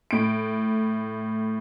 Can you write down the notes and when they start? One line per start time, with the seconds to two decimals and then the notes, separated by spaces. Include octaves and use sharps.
0.11 A2 D7